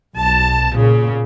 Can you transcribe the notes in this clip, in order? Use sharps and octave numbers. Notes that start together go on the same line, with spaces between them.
B1 A5
A#2 C#3